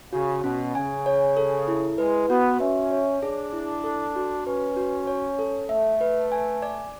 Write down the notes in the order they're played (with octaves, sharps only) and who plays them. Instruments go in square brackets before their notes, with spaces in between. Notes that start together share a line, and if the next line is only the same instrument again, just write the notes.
[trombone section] C#3 [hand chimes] F#4
[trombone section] B2 [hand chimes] C#4
[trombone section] C#3 [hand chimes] G#5
[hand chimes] C#5
A4
E4
[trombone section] G#3 [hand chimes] B4
[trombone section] B3 [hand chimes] F#4
[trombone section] C#4 [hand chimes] E5
[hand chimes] C#5
[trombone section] D4 [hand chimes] G#4
[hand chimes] E4
A4
F#4
[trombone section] C#4 [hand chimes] B4
[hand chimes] F#4
C#5
A4
[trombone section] A3 [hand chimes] E5
[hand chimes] B4
G#5
D5